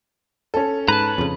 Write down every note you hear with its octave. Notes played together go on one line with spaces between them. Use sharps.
C#4 A4
G#2 B4 A5 A#5
F2 C#3